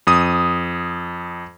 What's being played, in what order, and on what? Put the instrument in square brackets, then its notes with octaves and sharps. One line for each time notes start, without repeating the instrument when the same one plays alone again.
[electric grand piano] F2 D#6